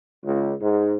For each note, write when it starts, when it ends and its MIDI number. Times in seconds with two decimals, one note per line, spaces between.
0.25 0.53 37
0.61 0.96 44